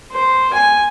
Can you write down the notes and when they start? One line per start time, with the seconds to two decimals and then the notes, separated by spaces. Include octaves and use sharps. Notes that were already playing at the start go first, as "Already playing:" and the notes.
0.12 C5
0.53 G#5